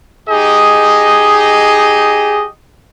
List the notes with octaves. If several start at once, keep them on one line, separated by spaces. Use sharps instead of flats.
D#4 G4 G#4 D#5